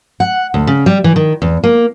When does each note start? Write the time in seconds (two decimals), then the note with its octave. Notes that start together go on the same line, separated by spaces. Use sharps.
0.20 F#5
0.54 D2
0.67 C#3
0.86 G3
1.04 E3
1.16 D#3
1.42 E2
1.64 A#3